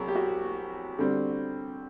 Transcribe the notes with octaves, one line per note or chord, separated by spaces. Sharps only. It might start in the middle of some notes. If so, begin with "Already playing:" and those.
Already playing: C2 F#3 G#4
G4
F#4
D3 G3 C4